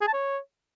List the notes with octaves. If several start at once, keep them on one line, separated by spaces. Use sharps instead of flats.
G#4
A5
C#5